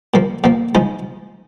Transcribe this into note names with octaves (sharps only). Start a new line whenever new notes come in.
A#2 F3 A#3
A#2 F3 A#3
C#3 F3 G#3 D#4